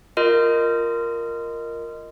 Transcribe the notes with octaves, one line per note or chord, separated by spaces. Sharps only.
F4 A#4 D#5